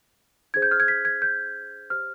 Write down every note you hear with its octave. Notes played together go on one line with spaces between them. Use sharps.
D4 G#4 C5 G#6
G6
F6
G#6
B6
G#6
G6
G4 C5 F6